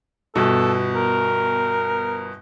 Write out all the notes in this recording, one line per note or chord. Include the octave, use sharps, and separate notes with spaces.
G1 B2 A4
A#4